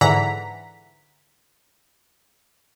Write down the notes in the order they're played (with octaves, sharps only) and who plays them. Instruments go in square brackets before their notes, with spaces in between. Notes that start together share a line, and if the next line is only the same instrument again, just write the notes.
[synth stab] G#2 D3 E3 F#5 A#5 B6